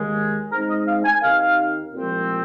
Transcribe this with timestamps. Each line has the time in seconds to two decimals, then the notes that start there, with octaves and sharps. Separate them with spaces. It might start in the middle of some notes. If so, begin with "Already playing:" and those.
Already playing: D#2 D#3 G#3
0.51 G#2 G#3 C4 D#4 A#4
0.70 D#5
0.88 F5
1.05 G#5
1.22 D#2 D#3 C4 D#4 F5
1.94 C2 A#2 F3 G#3 C4